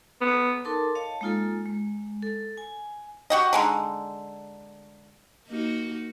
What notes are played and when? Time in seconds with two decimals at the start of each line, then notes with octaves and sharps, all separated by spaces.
0.21 B3
0.65 D#4 A4 A#4 A5 C6 D6
0.95 C#5 D#5 F5 A5
1.21 G#3 A#3 D#4 F4 A4
1.66 G#3
2.22 A4
2.57 G#5
3.30 F#4 G4 D#5
3.53 D3 G#3 D#4
5.48 A#3 D#4 F#4